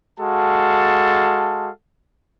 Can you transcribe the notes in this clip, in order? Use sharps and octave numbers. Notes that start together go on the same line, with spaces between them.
G#3 F#4 A4 F5 A5